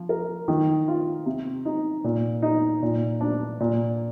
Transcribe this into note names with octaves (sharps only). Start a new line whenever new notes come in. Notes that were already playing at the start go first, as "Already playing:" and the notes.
Already playing: F3
A#4
D#3
F4
C3
D#4
A#2
D#4
A#2
D4
A#2